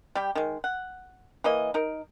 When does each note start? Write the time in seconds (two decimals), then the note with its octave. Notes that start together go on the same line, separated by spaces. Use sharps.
0.15 G3 G4
0.35 D#3 G#3
0.64 F#5
1.44 E3 A#3 D#5
1.74 D#4 A#4